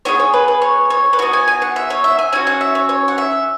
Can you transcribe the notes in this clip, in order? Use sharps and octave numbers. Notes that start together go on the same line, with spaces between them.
B3 E4 G#4 C#5
C#5
B4
B4
C#5
C#5
B4
B3 F#4 C#5
G#5
G#5
F#5
E5
C#5
E5
G#5
C#4 F#4 G#5
F#5
E5
C#5
C#5
F#5
E5